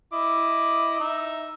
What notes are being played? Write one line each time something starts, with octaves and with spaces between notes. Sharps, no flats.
E4 D#5 D6
D#4 E5